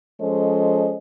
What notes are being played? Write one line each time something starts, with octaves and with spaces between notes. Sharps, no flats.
F3 G#3 C#4 A4 C5 D#5